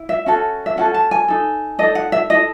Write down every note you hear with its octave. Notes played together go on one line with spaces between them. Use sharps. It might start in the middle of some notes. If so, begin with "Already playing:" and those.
Already playing: E4
E5
C#4 F#4 A4
E5
C#4 F#4 A4 F#5
A5
G#5
D#4 A4
D#4 A4 D#5
F#5
E5
E4 A4 D#5